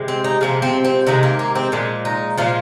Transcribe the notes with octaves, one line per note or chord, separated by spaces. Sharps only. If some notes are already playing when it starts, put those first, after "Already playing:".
Already playing: C3 G#3
C4
D#4
C3 F3 G#3 A#3
C4
C4
C3 D#3 G#3 D#4
A#3
A#3
C4
A#2 F3 G#3
D#4
A#2 F3 G#3 F4